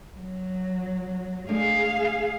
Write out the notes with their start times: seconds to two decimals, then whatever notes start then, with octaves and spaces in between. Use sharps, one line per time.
0.18 F#3
1.49 G#3 A3 D4 G#4 F5